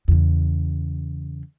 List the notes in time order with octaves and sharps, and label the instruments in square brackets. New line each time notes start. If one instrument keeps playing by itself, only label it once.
[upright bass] E2 C#3